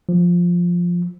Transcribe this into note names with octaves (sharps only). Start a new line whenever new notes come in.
F3